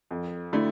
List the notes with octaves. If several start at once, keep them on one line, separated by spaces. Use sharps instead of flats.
F2
D3 A3 E4